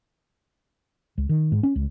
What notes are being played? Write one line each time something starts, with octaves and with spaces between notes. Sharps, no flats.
C#2
D#3
G#2
C#4
C#2